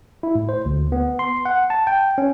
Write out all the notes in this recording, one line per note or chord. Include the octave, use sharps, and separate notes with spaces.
E4
A2
C5
D2
B3
C6
F#5
A5
G5
C#4